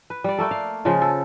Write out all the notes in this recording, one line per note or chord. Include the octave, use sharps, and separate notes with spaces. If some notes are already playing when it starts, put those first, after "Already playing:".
B4
G3 D5
A3 A#3 A4
F5
C#3 F3 G#3 F4
A4